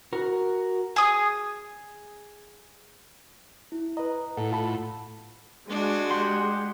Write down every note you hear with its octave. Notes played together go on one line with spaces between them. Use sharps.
F#4 A#4
G#4 D#6
E4
B4 D#5 A#5
A2 E4 A4 F#5
F4 A5 B5
G#3 D4 F#4
G4 F#5 C6